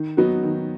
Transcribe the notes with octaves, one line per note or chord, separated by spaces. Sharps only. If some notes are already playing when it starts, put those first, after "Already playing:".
Already playing: D#3
F#3 B3 D#4 F#4
D#3